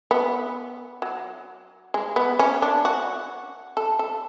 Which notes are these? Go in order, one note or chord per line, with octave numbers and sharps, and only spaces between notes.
B3
F#3
G#3
B3
C#4
D4
F#4
A4
A4